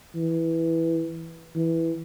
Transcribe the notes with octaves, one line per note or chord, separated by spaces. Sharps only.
E3
E3